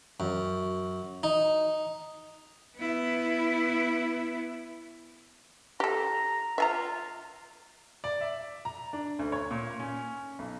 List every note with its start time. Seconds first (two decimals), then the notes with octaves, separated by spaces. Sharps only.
0.20 F#2
1.23 D#4
2.77 B3 E4
5.80 G4 A4 A#5
6.58 F4 E5 G#5 A#5
8.04 D5
8.21 E5
8.65 A#5
8.93 D4
9.19 D2
9.32 C#5
9.51 A#2
9.80 C#4
10.39 B1